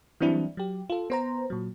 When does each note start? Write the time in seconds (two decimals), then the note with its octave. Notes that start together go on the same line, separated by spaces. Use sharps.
0.21 E3 F#3 G3 C4 D4 E4
0.57 F#3 G4
0.90 F4 A4
1.10 B3 C5 A#5
1.50 A#2 F#3